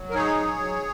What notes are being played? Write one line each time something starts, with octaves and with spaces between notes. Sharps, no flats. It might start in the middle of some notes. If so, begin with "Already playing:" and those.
Already playing: F#3
A#4
D#4 G#4 C#5
F#3
F#3